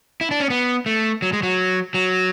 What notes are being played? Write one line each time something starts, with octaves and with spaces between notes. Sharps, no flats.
E4
D4
C#4
B3
A3
F#3
G#3
F#3
F#3